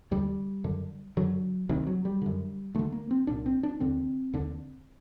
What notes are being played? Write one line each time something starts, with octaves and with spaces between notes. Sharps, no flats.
D#2 D3 G3
F#2 D3
F#2 D3 F#3
D2 C3 D#3
F#3
G3
F#2 D3
D2 D3 A3
A#3
C4
C2 A#2 D4
C4
D4
D#2 D3 C4
D#2 D3